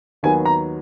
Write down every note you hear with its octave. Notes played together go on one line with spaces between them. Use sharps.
D#2 D#3 F#3 B3 F#4 G#5
A#5